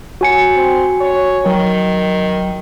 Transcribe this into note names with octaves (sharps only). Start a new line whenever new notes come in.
F#3 F#4 G#5 C#7
C4
C#5
D#3 F#3